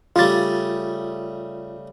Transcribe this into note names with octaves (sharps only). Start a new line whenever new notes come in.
C#3 G3 A3 F4 A6